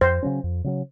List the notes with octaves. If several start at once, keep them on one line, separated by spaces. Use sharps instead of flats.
F2 C5
C#3 F#3 C#4
F2
C#3 F#3 C#4